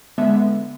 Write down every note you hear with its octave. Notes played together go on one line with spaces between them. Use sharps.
D3 G#3 B3 E5